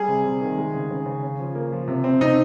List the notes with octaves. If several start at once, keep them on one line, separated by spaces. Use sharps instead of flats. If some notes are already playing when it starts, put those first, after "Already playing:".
Already playing: G3 G#4
C3
C3
D#3
G#3
C#3
C#3
C#3
C#4
F3
A#3
F3
C3
C4
C3 D#4